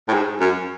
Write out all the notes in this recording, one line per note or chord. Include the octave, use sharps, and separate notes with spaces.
A2
G#2
F#2